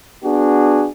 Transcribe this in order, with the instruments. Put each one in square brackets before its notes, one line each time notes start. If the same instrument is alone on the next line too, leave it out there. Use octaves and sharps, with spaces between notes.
[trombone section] B3 D4 F#4 G#4